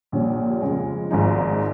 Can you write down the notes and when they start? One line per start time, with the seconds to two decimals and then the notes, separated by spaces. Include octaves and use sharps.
0.12 A#1 A#2 G3 C#4
0.61 F2 C#3 G#3
1.11 G#1 G#2 F3 G#3 D#4